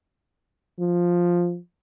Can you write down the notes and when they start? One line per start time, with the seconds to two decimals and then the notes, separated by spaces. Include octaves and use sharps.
0.80 F3